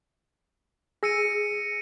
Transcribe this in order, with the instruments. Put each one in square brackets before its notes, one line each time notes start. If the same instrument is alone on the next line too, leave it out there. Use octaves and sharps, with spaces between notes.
[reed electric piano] G#4 E6 [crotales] A#6 C#7 D#7